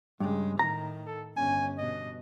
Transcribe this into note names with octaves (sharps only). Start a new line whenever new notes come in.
G2 C#3 G#3
A2 D#3 A#5
A4
G1 C#4 G#5
G2 B2 D#5